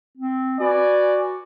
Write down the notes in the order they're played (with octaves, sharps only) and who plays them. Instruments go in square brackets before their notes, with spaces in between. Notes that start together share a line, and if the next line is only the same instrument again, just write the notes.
[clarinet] C4
[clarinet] F#4 [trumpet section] B4 D5 G#5